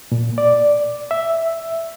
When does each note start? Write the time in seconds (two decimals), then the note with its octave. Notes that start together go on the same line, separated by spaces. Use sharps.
0.12 A#2
0.38 D5
1.11 E5